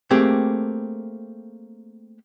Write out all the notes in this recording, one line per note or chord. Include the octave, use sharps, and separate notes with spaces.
A3 A#3 C4 G4 G#4